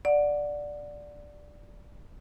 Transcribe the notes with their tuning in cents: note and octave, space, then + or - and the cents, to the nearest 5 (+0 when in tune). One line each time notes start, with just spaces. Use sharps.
D5 +0 F#5 -10